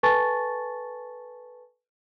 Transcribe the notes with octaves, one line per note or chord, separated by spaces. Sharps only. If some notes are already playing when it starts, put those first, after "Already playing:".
A4 B4 G#5 A5 C#6 A6